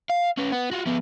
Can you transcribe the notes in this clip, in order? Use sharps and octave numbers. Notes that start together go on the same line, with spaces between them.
F5
C#4 B4
B3
F4 F#4
F3 B3